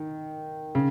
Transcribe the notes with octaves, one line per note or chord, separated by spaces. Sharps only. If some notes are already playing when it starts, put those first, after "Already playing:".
Already playing: D#3
C#3